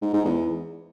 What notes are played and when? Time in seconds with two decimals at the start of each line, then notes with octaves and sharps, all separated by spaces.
0.02 G#2
0.13 G#2
0.25 E2